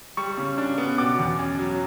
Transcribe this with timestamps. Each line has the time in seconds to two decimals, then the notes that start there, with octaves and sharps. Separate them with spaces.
0.17 G3 C#6
0.38 C#3
0.58 D4
0.78 B3
0.98 B2 D6
1.19 E2
1.39 C#4
1.59 F#3